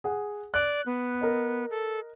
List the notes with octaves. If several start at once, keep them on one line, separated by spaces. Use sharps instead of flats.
G#4 F#5
D5 F#6
B3
A#4 D#5
A4